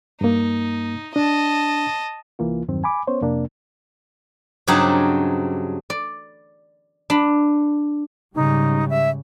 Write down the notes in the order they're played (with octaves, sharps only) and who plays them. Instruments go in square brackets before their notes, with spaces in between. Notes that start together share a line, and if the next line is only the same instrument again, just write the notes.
[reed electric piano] G2 A#3 [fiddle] D#4
[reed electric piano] D4 [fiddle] D#5 A5
[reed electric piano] C2 E3 A#3 F4
E2 G2 D#3 F#3 C4
G#5 B5 D6
B3 C#4 C5 C#5
F2 C3 A#3 D4
[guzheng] G2 C#3 F#3 C4 D4 D#4
D5
D4 B5
[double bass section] G#2 C#3 G3 [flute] D#4
[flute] E5